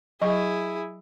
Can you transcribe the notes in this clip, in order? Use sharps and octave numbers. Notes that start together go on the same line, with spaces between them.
F#3 E4 G#4 D#5 C#6